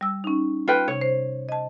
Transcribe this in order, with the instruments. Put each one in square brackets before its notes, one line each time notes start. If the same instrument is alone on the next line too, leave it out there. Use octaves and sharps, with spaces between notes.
[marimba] G3 E6
C#4 D#4
[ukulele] F4 B4 G5
[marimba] C3 [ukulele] C#5
[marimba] C5
D#5 A5